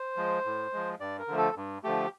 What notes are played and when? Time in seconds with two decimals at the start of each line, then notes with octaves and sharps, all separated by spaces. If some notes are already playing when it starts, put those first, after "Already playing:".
Already playing: C5
0.17 F3 G#3
0.45 A2
0.73 F3 G#3
1.00 G2 D5
1.19 A#4
1.28 D3 F3 A3
1.38 A4
1.56 G2
1.83 D3 F3 A3 G4